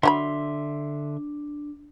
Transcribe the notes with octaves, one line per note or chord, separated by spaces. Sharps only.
D3 F#3 D4 F#4 E5 B5 C6